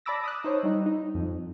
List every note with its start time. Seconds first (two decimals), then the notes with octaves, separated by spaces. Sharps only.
0.06 D5 A5 B5 D6 E6 A#6
0.24 D#6 E6 F#6
0.44 D#4 C5 C#5
0.63 G3 D#4
0.86 D#4
1.15 F2